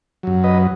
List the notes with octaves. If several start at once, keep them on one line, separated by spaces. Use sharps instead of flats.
F#2 F#3
B4 D#5